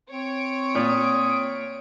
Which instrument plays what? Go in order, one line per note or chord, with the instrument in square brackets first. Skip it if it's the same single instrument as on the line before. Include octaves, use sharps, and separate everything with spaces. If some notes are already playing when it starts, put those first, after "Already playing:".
[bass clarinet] C4 [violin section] C#5 D7
[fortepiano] A#2 [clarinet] D#6